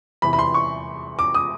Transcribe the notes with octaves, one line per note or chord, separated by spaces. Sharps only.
E2 C3 E3 B5
B5
C6
C#6
D6
D#6